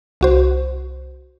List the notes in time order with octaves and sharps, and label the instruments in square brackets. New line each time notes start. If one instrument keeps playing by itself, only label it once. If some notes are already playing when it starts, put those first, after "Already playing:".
[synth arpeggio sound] C2 F#4 C5